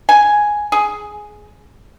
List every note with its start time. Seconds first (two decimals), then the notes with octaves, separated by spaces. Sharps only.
0.09 G#5
0.72 G#4